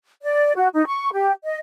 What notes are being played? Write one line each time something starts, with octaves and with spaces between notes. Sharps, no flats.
D5
F#4
D#4
C#6
G4
D#5